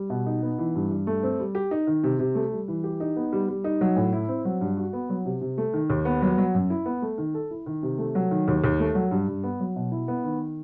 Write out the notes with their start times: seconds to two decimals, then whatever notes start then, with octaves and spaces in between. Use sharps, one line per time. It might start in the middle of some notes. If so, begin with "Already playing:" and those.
Already playing: G3
0.10 B2
0.26 D#4
0.42 B3
0.59 E3
0.75 G2
0.91 G2
1.07 A3
1.23 C4
1.40 G3
1.55 G4
1.71 D#4
1.87 D#3
2.04 C3
2.19 C3
2.35 A3
2.52 G3
2.68 E3
2.84 G4
3.00 D#4
3.16 B3
3.33 G3
3.49 G3
3.64 D#4
3.81 F#3
3.96 A2
4.13 E4
4.29 C4
4.45 F#3
4.61 G2
4.77 F#4
4.93 B3
5.10 F#3
5.25 C3
5.41 C3
5.58 A3
5.74 D#3
5.90 D#2
6.05 B3
6.22 F#3
6.38 F#3
6.54 F#2
6.70 E4
6.86 B3
7.02 A3
7.18 D#3
7.34 A4
7.51 E4
7.66 D#3
7.83 C3
7.98 A3
8.15 F#3
8.31 D#3
8.48 D#2
8.63 D#2
8.80 A3
8.95 F#3
9.11 G2
9.28 G2
9.43 B3
9.60 F#3
9.76 B2
9.92 E4
10.08 B3
10.24 D#3